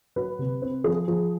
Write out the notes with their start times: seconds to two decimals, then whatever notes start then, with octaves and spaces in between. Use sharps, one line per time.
0.16 F#3 B4
0.39 C3
0.62 C4
0.84 F3 G#4
1.08 F3